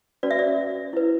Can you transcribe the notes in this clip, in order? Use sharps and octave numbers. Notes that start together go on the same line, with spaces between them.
C#4 F#4 B4 D5
E5
D5
E4 B4